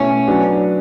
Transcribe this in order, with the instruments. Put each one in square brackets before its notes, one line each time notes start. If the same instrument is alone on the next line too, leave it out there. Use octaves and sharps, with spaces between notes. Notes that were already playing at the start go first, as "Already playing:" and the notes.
Already playing: [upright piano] B2 A3 E4 [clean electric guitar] C#4
[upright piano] F#3 B3 D4